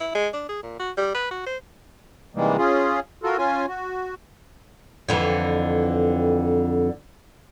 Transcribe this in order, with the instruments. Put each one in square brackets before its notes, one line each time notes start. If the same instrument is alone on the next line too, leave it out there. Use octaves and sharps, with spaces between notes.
[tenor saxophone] E4
G#3
D4
G#4
A#2
F#4
G3
B4
F#4
C5
[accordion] C3 D#3 E3 G3 G#3 A#3
C#4 F4 G#4
F4 F#4 A4 A#4
C#4 F4 G#5
F#4
[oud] F2 D3 E3